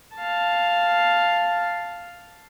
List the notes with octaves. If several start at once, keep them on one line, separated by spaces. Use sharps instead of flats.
F5 A5